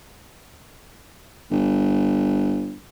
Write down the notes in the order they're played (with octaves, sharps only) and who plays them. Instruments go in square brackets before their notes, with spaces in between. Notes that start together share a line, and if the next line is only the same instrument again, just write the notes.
[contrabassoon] G1